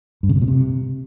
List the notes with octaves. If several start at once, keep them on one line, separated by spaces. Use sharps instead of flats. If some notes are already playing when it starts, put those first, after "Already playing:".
G2
C#3
C3
A#2
C3